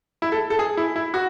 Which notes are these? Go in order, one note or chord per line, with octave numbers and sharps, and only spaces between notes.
E4
A4
A4
G#4
E4
E4
F#4